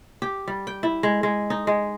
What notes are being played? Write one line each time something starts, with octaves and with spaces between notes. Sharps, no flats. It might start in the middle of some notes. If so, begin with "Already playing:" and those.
G4
G3
G5
E4
G#3
G#3
D#4
G#3